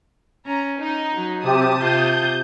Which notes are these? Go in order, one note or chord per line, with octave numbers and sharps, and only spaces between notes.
C#4 A#5
D#4
F#3
C3 G4 A5 D#6
C3 F4 G6